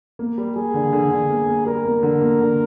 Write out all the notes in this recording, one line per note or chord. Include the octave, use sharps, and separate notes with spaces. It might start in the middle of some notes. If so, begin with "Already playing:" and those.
A#3
G3
G3 G#4
D3
D3
D3
A#3
A#3
G3 A#4
A#3
D3
A#3
D3